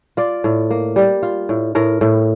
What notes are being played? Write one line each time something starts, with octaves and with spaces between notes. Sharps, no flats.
F4 D5
A2
A#3
G3
F4
A2
A2 A#4
A2